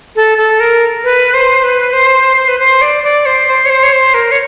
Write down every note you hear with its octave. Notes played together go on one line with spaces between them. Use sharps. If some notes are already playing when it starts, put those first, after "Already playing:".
A4
A4
A#4
B4
C5
B4
C5
C5
B4
C5
D5
D5
C5
C5
C#5
C5
C#5
C5
A#4
C#5